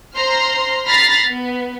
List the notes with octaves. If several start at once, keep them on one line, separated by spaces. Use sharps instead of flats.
C5 A#5 C6 F6
A#5 B5 F6 A6 A#6 C7
B3